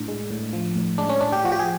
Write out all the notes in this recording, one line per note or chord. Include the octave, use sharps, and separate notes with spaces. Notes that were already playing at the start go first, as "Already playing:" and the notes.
Already playing: A2 D4
G#3
A2
F3
A2
G#3 D4
C#4
A2 D4
G4
F3 F#4
G4
G#4